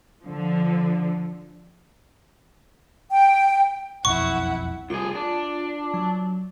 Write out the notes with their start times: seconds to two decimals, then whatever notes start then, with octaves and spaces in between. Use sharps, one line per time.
0.23 D3 F3
3.10 G5
4.05 E1 B1 F2 E4 F#5 C#6
4.90 C2 F4 G#4
5.15 D4
5.94 F#3